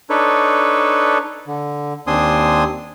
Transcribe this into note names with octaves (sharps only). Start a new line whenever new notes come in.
D4 D#4 A4 B4 C#5
D3
D#2 C4 D4 G#5 C6 D#6